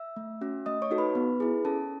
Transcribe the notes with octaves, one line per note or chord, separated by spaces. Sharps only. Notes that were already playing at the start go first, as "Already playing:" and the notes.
Already playing: E5 E6
A3
C#4 F#4
A3 D#5 D#6
C#5 C#6
D#4 F#4 A4
B4 B5
B3
E4 G#4
C#4 A4 A5